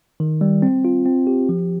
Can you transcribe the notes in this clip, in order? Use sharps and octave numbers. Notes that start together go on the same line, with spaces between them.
D#3
G3
C4
F4
C4
G4
F3